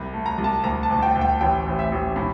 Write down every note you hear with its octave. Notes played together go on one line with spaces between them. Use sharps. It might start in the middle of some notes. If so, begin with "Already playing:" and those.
Already playing: C2
A3
A#5
C2
A5
D2 A#5
A5
D2
G5
D2
G5
A1 G5
A1
E5
A1
A2